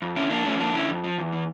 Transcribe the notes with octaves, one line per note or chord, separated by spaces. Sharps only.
F2
D3 C#4 E4
F2 A#3 D4
F3 A3 C#4
F2 A#3 D4
D3 C#4 E4
F2
F3
E2
E3